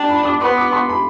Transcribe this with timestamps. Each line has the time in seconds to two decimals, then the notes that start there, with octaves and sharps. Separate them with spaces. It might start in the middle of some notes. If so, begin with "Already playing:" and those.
Already playing: D4 G5 A5
0.09 B5
0.25 D6
0.40 B3 C6
0.57 D6
0.72 C6
0.89 B5